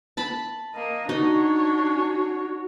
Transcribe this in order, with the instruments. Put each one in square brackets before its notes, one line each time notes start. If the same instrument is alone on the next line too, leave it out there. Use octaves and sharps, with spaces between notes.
[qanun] A5 B5
[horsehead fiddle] A#3 D#5
[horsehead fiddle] D4 C#5 [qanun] D#4 [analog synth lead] F#4